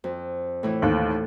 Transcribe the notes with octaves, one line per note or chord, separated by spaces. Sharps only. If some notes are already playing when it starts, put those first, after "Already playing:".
F2
A2 E3 E4
D#2 A4 F#6